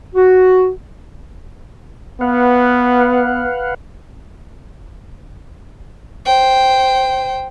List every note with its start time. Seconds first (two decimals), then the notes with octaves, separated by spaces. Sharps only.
0.14 F#4
2.21 B3 B4 F5 F#5
6.26 C5 G5